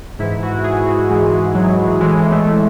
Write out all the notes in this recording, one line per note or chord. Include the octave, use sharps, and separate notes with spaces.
G#2 E3 E4
F#4
G#4
F#4
G#2 E3 G#3
F#3
A2 E3 G#3
A3